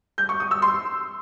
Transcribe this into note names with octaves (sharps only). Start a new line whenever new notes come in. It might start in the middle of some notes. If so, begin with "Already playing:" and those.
G6
C#6
D#6
E6
C6